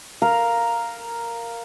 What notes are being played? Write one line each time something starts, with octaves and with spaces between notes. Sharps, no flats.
A#4 F5